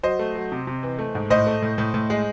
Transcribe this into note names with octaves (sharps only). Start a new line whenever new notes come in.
F#3 C5 D#5
A3
F#3
C3
C3
E3
A3
G#2
A2 C5 D#5
A3
A2
A2
A2
G#3